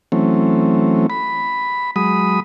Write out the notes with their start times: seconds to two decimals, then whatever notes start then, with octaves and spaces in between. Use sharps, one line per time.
0.12 E3 F#3 A3 C4 C#4
1.10 B5
1.96 F#3 G#3 B5 D#6